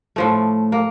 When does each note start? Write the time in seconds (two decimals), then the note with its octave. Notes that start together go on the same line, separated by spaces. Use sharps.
0.16 A2 F3 A3
0.72 A#3